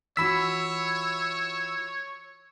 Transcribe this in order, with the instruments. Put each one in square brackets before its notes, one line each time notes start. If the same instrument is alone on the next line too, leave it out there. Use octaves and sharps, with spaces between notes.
[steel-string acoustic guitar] E3 F4 F#4 [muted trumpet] C#5 [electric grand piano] B5 B6 [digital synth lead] E6